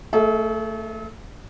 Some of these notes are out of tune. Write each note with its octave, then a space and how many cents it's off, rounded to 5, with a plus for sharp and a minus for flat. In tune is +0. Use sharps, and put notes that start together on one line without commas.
A3 +25 A4 -45 E5 -45